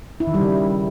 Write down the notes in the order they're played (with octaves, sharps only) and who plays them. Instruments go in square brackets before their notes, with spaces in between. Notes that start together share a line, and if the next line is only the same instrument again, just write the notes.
[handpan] E4
D#3
G3
C#3